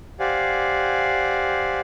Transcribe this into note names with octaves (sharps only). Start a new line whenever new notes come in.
G4 C5 D5 F5 F#5 G#5